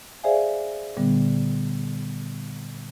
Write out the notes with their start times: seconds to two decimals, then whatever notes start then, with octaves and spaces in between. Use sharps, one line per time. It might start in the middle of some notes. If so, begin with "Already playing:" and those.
0.23 G#4 C5 D5 E5 F5 G#5
0.97 A#2 D3 G3 B3